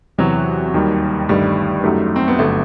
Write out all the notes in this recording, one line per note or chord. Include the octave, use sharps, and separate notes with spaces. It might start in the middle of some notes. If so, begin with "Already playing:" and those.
E2 C3 E3 F#3 B3 F#4
D#2 D#3 G3
G1 G2 D#3 G3 A3
F#2 F#3 A3 D#4 G4
C4
B3
G1 F#3 A3